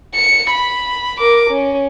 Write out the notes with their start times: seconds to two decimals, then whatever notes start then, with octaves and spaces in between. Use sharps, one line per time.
0.15 C#7
0.51 B5
1.19 A#4 D6
1.51 C#4